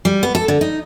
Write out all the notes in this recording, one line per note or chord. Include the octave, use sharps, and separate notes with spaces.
G3
B3
A4
D3
D#4